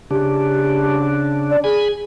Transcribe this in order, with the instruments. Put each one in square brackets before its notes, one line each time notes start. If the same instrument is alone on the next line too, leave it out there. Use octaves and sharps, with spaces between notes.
[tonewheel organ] C#3 D4 [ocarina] G4
[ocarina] D5
[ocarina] G#4 [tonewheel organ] G#5 B5